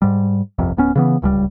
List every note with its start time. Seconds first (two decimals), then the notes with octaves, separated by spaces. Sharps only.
0.02 G#2 G3
0.58 G1 C2 F2 C3
0.77 D1 B3 C#4
0.96 C#3 E3 B3
1.22 D1 C#2 D3 G3